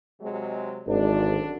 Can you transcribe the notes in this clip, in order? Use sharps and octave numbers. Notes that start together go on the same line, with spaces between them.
C3 F#3 G#3
G#1 F#2 D3 D4